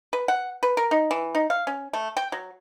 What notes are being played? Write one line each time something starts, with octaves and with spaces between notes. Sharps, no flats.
B4
F#5
B4
A#4
D#4
E3
D#4
F5
C#4
A3
G5
F#3